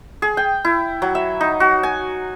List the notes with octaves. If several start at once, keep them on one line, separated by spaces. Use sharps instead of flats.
G#4
G5
E4
F#3
E5
D#4
F#4
G#5